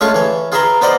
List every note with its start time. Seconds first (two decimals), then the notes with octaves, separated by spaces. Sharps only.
0.01 G#3 A3 C#4 F4 F5 C#6
0.14 E3 C#5
0.52 F4 G#4 B4 E5 A#5 C6
0.81 B3 F4 C5 D5 D#5 F#5